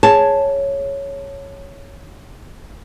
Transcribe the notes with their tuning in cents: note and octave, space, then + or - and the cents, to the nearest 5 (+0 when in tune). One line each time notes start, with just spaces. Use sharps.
G#4 +0 C#5 +0 A5 +0